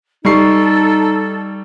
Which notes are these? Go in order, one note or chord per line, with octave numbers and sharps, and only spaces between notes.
G3 D#4 A4 C#6 C7